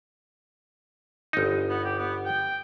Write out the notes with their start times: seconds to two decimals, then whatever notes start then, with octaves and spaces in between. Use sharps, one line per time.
1.33 G1 D#4
1.69 B3
1.85 G4
1.98 B3
2.25 G5